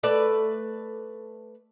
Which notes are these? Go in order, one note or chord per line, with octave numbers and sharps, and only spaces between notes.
A3 B4 D5